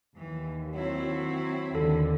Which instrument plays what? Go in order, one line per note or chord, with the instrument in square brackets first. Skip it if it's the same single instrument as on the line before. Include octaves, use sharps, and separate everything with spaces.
[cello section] D#2 [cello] E3
[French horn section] F#3 [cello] C4 E4
[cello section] D#2 D3 [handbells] A4